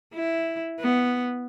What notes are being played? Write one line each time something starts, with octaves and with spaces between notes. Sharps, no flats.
E4
B3